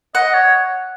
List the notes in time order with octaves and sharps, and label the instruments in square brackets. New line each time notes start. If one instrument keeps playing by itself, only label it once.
[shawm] D#5 [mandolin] F#5
[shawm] C#5